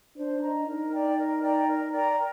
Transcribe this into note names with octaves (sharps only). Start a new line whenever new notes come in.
D4 C5
D#5 A#5
D#4 A#4
D5 G5 A#5
A#4
D5 G5 A#5
A#4
D5 G5 A#5
A#4